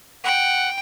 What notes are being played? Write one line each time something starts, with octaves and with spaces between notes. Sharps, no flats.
F#5 G5